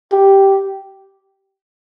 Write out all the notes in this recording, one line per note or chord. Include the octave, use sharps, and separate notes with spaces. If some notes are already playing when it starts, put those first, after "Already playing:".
G4